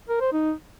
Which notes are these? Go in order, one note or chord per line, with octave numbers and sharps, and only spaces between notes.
A#4
C5
D#4